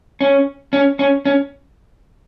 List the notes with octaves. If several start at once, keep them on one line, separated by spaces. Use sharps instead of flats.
C#4
C#4
C#4
C#4